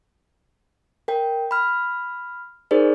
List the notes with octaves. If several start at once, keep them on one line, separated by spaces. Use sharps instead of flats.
A#4 G5
B5 F6
D#4 G#4 A#4 C5 D5